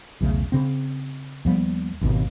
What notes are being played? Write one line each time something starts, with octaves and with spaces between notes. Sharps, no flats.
B1 E2 C#3 A3
C#3 C4
D#2 F3 G3 B3
G#1 D#2 B2